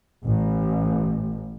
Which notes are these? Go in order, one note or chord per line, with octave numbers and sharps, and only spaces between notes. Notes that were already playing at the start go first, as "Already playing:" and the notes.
A1